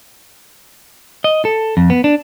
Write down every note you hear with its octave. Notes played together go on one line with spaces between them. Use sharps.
D#5
A4
F2
B3
D4